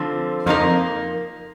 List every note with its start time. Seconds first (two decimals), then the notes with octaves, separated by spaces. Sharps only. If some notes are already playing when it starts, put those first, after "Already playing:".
Already playing: D3 F3 C4
0.46 F2 F3 A#3 D#4 A#4